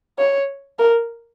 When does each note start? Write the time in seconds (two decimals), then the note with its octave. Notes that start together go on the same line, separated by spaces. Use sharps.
0.18 C#5
0.79 A#4